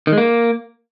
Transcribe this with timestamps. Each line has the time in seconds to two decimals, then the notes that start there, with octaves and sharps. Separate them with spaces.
0.07 D#3
0.12 G#3
0.18 A#3